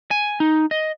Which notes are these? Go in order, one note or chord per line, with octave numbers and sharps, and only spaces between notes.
G#5
D#4
D#5